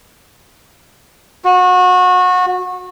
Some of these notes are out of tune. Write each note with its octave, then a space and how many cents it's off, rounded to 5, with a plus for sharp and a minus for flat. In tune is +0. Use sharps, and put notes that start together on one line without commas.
F#4 -25